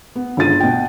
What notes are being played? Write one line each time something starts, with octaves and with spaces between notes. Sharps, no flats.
B3
G1 C#2 F4 A6 D#7
B2 F#4 G5